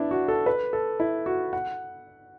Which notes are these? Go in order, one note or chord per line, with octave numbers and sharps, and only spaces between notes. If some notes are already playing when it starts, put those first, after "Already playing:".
Already playing: B3 D4 E4
F#4
A4
B4
A4
E4
F#4
F#5